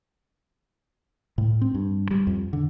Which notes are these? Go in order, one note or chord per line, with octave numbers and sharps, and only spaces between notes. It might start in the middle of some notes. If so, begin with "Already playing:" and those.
A2
C4
G2
G3
F2
D3